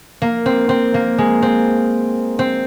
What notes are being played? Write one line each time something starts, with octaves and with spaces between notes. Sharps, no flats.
A#3
C4
C4
A#3
G#3
C4
C4